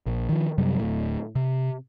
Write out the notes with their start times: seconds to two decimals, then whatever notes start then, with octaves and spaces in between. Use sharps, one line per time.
0.06 A#1
0.29 D#3 F3
0.58 F#2 C3 F#3 G3
0.79 D1 A2
1.35 C3